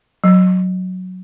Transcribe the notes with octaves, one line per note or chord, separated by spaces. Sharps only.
F#3